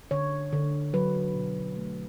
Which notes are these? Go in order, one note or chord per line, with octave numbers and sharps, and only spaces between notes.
D3 C#5
D3
F#3 B4
B2
A3